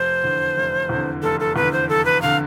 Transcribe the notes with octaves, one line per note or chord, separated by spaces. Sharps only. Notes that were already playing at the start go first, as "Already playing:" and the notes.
Already playing: F1 C5
E2 D3
F1
E2 D3
F1 A4
A4
E2 D3 B4
C5
F1 A4
B4
D3 F5